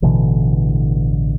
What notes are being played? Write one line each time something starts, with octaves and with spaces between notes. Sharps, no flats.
A1 B2 D3 E3